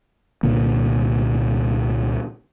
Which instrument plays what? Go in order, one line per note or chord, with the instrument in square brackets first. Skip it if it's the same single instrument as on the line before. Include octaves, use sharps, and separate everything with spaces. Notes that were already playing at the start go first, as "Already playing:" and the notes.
[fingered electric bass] C2 A#2 D3 A#3